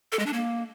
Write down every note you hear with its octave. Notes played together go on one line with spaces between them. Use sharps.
A4
G#3
D4
A#3